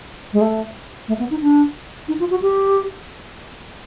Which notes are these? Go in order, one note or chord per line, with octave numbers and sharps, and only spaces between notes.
G#3
A3
A3
B3
D#4
D4
D#4
F4
F#4
G4